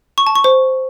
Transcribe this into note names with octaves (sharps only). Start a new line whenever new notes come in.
C#6
A5
C#6
C5